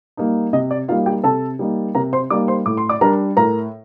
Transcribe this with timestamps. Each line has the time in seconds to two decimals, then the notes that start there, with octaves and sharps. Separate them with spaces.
0.17 G3 A#3 D#4
0.53 C3 D#5
0.71 D5
0.88 G3 A#3 D#4 F4 F5
1.06 G4 G5
1.24 C3 A4 A5
1.59 G3 A#3 D#4
1.95 C3 A#4 A#5
2.13 C5 C6
2.30 G3 A#3 D#4 D5 D6
2.48 C5 C6
2.66 A2 D6
2.77 C6
2.89 D5 D6
3.01 G3 D4 A#4 A#5
3.37 A2 A#4 A#5